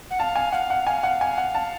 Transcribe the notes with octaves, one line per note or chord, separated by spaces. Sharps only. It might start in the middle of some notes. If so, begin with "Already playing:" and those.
F#5
F5 A5
G#5
F5 F#5
F#5
F5 G#5
F#5
G#5
F#5
A5